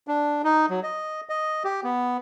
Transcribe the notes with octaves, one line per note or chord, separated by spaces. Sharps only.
D4
D#4
F#3
D#5
D#5
G4
B3